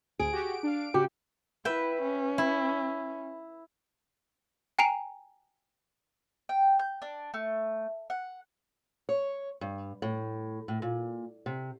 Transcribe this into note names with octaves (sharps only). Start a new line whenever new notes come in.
D2 G#4 D7
F#4 G4
D4 F5
C#3 F#4 G4
E4 B4 E5 G5
C#4
E4
G5 G#5 A#5 C7 D7 F7
G5
G6
D4
A3
F#5
C#5
G2
A2
A2
A#2
C3